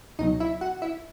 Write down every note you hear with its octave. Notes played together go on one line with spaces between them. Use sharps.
C#2 B2 F#3 D#4 D#5
E4 E5
F#4 F#5
E4 E5